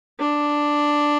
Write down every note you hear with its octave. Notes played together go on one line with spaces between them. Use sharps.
D4